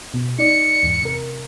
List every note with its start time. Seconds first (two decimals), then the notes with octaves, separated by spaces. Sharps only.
0.14 B2
0.38 D#4 D5 C#7
0.83 E2 G#2
1.02 C3 A#4